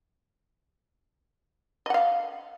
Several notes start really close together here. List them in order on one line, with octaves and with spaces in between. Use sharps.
D#5 F#5 F5